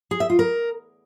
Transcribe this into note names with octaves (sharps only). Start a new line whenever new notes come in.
G#4
E5
F4
A#4